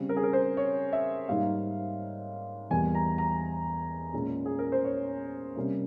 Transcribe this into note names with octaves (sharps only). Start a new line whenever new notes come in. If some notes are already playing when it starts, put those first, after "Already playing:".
Already playing: C#3 G3 C4
A#4
G#4
A#4
C5
C#5
E5
G#2 G3 A#3 F5
E2 E3 G3 A#3 G#5
A#5
A#5
A#2 G#3 C#4
G#4
A#4
C5
C#5
C3 G3 A#3 C#4